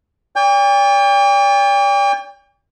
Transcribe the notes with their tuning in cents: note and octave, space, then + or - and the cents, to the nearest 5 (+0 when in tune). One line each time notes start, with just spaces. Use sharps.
D5 -40 G5 +40